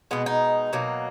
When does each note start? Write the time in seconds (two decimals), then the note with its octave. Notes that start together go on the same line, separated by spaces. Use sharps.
0.11 B2 G#3 B3
0.26 D#4
0.73 B2 F#3 A#3